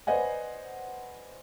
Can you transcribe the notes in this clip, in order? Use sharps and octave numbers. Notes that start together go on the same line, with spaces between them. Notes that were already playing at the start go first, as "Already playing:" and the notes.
B4 C5 D5 D#5 F#5 G#5